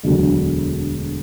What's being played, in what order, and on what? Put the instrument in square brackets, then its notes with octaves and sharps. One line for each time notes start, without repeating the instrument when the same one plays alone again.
[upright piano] E1 D2 D3 F#3